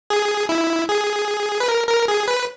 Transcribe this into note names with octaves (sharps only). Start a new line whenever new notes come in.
G#4
E4
G#4
B4
A#4
A#4
G#4
B4